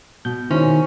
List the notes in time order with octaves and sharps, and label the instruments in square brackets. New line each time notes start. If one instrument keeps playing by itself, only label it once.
[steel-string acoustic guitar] B2 [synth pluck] G6
[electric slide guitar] D#3 [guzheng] C#4 [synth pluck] E4 C5